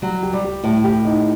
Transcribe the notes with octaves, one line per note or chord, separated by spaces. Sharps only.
F#3 G3
G4
G3
G4
A2 G4
G4
D#4